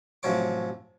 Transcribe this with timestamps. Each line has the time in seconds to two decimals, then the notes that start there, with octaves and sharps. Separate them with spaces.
0.23 A1 C3 F3 F#3 C#5 D6